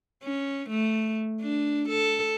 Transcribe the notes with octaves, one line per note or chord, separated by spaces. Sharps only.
C#4
A3
D4
A4